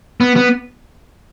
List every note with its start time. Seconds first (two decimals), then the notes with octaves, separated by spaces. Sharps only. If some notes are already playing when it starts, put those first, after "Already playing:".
0.21 B3
0.36 B3